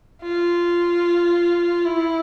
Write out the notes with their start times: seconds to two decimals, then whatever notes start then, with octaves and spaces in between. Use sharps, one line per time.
0.22 F4
1.85 E4